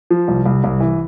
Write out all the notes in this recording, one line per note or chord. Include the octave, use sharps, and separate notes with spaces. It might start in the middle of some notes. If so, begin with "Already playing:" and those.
F3
C2
C2
C2
E3